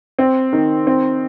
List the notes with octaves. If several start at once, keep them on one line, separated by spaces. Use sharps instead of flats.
C4
D#3
C4